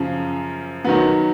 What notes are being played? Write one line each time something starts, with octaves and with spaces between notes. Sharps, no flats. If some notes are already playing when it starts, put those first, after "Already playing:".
Already playing: F#2 C#3 F3
D#3 F#3 B3